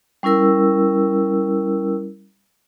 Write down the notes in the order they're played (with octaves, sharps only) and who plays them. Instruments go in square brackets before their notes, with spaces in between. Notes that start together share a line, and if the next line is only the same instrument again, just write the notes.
[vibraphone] G3 C#4 E4 A#4 E6